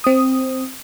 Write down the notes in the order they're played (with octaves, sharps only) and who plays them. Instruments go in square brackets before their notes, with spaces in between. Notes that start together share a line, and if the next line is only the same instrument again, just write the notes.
[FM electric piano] C4 D#6